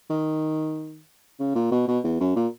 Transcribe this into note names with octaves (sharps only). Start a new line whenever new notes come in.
D#3
C#3
A#2
B2
B2
E2
F#2
A#2